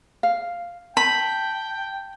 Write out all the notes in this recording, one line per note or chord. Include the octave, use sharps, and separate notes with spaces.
F5
G5 A5 B5